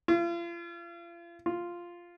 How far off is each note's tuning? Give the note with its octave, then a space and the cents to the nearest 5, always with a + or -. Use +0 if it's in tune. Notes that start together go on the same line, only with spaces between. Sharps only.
F4 -40
F4 -5